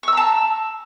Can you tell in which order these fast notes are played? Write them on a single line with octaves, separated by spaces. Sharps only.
C#6 E6 A#5 A5